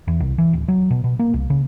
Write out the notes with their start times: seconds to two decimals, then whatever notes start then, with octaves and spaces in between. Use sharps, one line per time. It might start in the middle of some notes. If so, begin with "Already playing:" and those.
0.08 E2
0.20 C2
0.38 E3
0.53 D1
0.68 F#3
0.90 B2
1.04 B2
1.19 A#3
1.34 C2
1.50 C#3